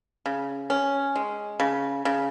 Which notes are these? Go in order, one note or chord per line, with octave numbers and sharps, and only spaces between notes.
C#3
C#4
G#3
C#3
C#3